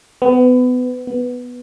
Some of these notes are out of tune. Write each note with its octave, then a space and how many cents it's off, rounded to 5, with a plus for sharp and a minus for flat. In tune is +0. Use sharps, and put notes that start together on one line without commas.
B3 +25
B3 +0